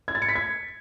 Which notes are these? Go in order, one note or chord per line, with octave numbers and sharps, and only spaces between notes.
G#6
A6
C#7
B6
G#6